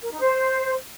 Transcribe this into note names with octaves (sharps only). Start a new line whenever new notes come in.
A#4
D#4
C5